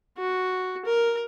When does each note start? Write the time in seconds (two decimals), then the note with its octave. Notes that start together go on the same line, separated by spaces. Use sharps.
0.18 F#4
0.85 A#4